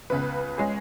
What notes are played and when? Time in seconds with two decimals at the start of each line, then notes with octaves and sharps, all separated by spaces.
0.10 C#2 C#3 B3 B4
0.58 G#3 C#4 G#4